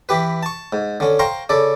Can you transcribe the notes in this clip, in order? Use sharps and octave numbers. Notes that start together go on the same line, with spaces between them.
E3 G4 B4
A5 C#6
G#2
D3 C#4
C5 F5 G5 A#5 C6 C#6
C#3 A4 D5